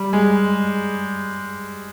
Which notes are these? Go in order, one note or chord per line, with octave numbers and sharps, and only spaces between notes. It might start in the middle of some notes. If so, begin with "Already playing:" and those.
Already playing: G3
G#3